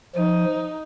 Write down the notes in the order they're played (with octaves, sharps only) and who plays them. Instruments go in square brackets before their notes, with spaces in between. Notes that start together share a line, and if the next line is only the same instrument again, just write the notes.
[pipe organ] F3 [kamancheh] D#4